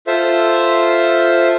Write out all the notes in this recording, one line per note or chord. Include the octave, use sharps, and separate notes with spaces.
F4 A4 C5 E5